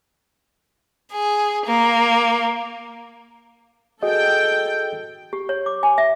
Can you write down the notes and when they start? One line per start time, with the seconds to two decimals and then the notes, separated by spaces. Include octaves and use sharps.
1.13 G#4
1.65 A#3
4.03 F#4 G#4 A4 D#5 G5
5.33 G4
5.49 C#5
5.66 D6
5.83 G#5
5.98 E5